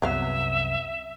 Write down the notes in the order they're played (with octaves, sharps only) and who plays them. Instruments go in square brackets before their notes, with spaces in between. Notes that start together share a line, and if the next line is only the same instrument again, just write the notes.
[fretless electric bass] C2 F#2 C3 [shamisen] F#3 B3 F5 [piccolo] E5